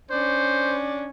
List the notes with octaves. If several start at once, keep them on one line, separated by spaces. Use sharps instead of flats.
C#4 D4 C5